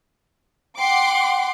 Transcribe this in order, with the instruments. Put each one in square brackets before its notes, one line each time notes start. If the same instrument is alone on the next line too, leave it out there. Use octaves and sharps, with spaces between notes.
[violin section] F#5 C6 D6 [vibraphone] G5